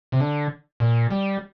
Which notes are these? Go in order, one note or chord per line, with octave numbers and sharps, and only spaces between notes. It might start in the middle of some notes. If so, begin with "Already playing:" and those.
C3
D3
A#2
G3